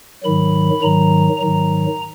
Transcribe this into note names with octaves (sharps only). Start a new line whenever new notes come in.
G#2 D#3 F#3 B5
G#2 D#3 F#3 A#5
G#2 D#3 F#3 A#5